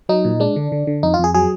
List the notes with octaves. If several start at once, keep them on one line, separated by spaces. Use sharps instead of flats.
F#3 D#4
A#2
G#3 D4
D3
D3
D3
F2 D#4
F4
F2 G#4
F#3 G#4